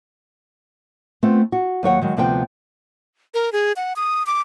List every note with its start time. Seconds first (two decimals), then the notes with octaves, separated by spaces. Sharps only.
1.23 A3 B3 C4 F4
1.52 F#4
1.83 D#2 F#3 C#5 F#5
2.02 D#3 F#3 G#3
2.17 D2 C3 F3 B3 G5
3.34 A#4
3.53 G#4
3.76 F#5
3.96 D#6
4.27 D6